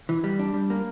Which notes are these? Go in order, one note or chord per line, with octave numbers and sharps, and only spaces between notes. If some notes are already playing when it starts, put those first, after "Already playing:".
E3
G3
D4
G3
A#3